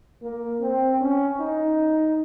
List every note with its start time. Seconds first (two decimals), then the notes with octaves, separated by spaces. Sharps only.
0.22 A#3
0.61 C4
1.01 C#4
1.40 D#4